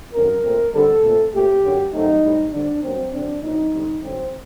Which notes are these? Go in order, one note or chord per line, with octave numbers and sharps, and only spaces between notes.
F#2 D#3 A3 C4 A#4
A#2 A3 C4
D3 G3 C4 A4
A#2 A3 C4
A#2 A3 C4 G4
F#2 D3 F#3
F#2 F#3 A3 C4 D#4
A2 G3 C4
D3 G3 C4 D4
G2 F#3 A#3 C4
D3 F#3 C4 D4
A#2 F#3 C4 D#4
D3 G3 C4
G2 D3 F#3 C4